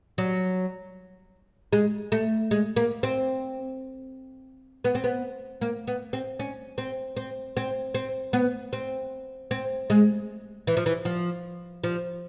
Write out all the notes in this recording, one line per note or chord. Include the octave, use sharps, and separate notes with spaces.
F#3
G#3
A3
G#3
A#3
C4
B3
C4
B3
A#3
B3
C4
C#4
C4
C4
C4
C4
B3
C4
C4
G#3
E3
F3
E3
F3
F3